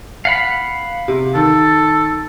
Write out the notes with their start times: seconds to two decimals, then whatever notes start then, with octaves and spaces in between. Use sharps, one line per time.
0.25 F5 F#5 B5
1.08 C3
1.35 D#3 A4